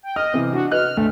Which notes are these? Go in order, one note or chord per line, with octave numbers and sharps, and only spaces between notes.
G5
D#5 F6
C3 E3
D4 F#4
B4 D#5 F6 F#6
D2 A3